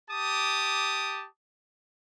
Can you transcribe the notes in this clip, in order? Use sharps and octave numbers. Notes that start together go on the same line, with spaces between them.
G4 A5 D6 D#6